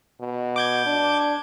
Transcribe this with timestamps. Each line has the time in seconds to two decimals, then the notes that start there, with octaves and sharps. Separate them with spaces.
0.21 B2
0.56 D6 G6 G#6
0.86 D4